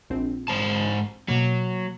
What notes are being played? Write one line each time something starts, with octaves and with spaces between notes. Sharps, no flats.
A#1 C4
G#2 C5 A5
B2 F#3 A#3